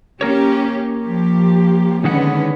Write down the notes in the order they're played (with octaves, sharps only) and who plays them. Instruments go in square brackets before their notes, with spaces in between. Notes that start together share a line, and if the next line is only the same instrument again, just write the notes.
[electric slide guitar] A#3 A#4 C#5 [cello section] C#4 G4
[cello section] F3 G4
[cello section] D3 B3 C#4 [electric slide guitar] D#3 G#3 F#5